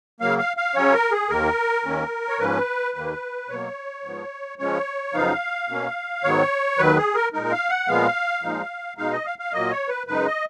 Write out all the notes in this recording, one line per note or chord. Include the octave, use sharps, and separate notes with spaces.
C#3 F#3 A#3 F5
F5
F5
C#3 F#3 C#4 C#5
A#4
G#4
D#2 D#3 A#3 A#4
D#2 D#3 A#3 C#4
C#5
G#2 F3 A#3 C#4 B4
D#2 D#3 A#3
B2 F#3 A#3 C#5
G#2 F3 B3
C#3 F3 G#3 C#4 C#5
F#2 C#3 F3 B3 D#4 F5
B2 A#3 C#4
G#2 D#3 F#3 B3 C#5
D#2 D#3 F#3 B4
G#4
A#4
A#2 G#3 D#4 A#4
F5
F#5
A#2 F3 G#3 B3 F5
A#2 F3 G#3 D#4
B2 G#3 D#4 F5
D#5
F5
F5
A#2 F#3 A#3 D#5
C#5
B4
F#2 C#3 G#3 D#4 B4
D#5